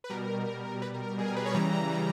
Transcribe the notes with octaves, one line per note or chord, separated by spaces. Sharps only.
B4
B2 G3 A#4
B2 G3
B2 G3 B4
A#4
A#4
B2 G3 G#4
A#4
B4
C#5
C#3 E3 G3 A#5
C#3 E3 G3